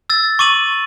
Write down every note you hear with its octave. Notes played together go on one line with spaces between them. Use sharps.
E6 A6
C#6 D6 D#7 F#7